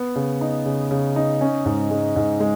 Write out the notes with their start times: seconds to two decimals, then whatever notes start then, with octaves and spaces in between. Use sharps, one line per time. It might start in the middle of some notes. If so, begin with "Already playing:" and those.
Already playing: B3
0.16 C#3
0.41 D#4
0.65 C#3
0.91 C#3
1.16 D#4
1.41 C#4
1.65 G#2
1.91 G#3
2.16 G#2
2.40 G#3